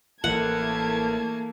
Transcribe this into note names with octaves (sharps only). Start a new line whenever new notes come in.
A1 E3 A3 A#3 F#5 A5 G#6